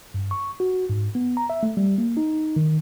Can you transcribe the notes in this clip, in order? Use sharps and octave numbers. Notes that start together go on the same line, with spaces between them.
G2
C#6
F#4
G#2
B3
A#5
E5
A3
G3
A#3
D#4
D#3